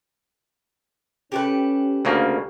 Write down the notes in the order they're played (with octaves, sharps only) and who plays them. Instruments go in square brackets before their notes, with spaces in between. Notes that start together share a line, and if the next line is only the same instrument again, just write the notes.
[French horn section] C#4 [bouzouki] G4 A4 B4
[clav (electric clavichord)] D2 C#3 A#3